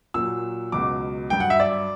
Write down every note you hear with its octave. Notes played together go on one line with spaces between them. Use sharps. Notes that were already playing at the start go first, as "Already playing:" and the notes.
A#2 F#3 E6
C#2 B2 F#3 D6
G2 F#3 G5
F#5
E5
D5